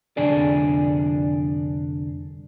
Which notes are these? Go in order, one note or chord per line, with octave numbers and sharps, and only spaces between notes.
C2 F2 D3 D4 G#4 D5